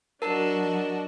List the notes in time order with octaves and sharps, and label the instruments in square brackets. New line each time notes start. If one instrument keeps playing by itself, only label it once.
[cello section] F#3 [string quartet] D4 F#4 D#5 [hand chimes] A#4 [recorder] A5